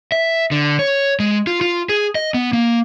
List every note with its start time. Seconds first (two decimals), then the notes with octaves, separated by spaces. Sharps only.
0.12 E5
0.51 D3
0.79 C#5
1.20 G#3
1.47 F4
1.61 F4
1.89 G#4
2.15 D#5
2.34 B3
2.53 A#3